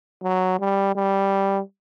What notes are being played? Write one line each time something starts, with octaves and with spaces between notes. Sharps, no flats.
F#3
G3
G3